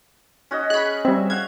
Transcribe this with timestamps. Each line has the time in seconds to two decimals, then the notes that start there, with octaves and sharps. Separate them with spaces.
0.51 C#4 F#4 D#5
0.70 G#4 B5 C#6 F#6
1.05 G3 C4 E5
1.30 F5 F#5 G#6